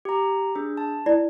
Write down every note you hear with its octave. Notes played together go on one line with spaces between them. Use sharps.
G4 A#5
D4 G#4
A5
E4 D5